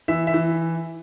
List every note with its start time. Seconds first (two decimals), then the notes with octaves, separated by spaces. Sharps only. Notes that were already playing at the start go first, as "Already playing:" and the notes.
0.08 E3 E5
0.27 E5
0.34 E3